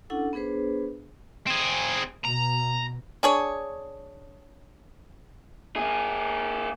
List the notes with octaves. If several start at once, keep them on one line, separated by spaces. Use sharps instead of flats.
C#4 D4 E4 A4 F#5
B3 D4 G#4 B4 C5
C4 G#4
B2 A#5
D4 G#4 C#5
A#3 G#4